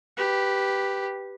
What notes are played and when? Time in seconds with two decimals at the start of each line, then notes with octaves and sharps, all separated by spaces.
0.17 G4 B4